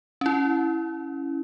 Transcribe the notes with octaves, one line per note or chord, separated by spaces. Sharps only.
C#4 E4